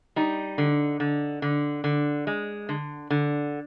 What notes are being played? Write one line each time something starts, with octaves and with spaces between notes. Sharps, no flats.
G3 D#4
D3
D3
D3
D3
G#3
D3
D3